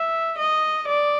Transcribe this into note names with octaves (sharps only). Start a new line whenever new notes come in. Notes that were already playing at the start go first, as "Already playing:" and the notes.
Already playing: E5
D#5
D5